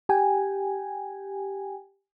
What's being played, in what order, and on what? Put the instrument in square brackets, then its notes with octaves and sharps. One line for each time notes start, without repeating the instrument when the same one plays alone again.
[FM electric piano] G4 G5 G#5